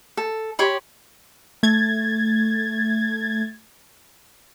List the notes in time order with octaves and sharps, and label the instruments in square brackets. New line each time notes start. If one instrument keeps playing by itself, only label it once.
[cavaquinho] A4
G4 C#5 B5 C6
[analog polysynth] A3 G#6 A6